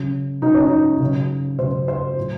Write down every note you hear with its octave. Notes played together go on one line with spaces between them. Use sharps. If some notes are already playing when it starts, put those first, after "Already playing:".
Already playing: C#3 F#3
C#3 F#3 D#4
C#4
D#4
C#3 F#3
C#3 F#3 C5
C5
A2 F#3